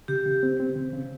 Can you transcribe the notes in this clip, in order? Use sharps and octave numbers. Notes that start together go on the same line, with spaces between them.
C#3 G4
C#3
C4
C4
C#3
C#3